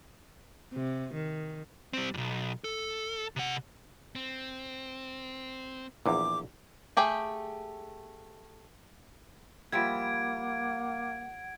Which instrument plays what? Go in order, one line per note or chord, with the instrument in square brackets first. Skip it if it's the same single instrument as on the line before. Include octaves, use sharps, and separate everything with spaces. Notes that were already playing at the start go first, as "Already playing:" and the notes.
[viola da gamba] C3
D#3
[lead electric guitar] G3 C4
B1 E2
A4
C3 F#5
[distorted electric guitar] C4
[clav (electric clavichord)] A#1 E2 [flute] D6
[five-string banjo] A3 G4 G#4 G5
[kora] F3 G3 E4 [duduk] A#3 [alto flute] F#5 [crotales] G#6 D7